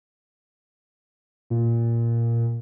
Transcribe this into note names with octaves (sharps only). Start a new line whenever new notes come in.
A#2